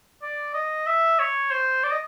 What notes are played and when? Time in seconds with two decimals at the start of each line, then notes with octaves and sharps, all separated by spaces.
0.22 D5
0.54 D#5
0.86 E5
1.19 C#5
1.51 C5
1.84 D5
1.92 D#5